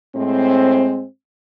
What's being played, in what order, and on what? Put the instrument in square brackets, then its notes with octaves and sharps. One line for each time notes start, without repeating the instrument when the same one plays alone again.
[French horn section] A2 G#3 C4